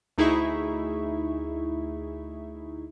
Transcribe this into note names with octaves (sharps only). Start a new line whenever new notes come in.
D2 D#4 E4 G#4 E5 C#6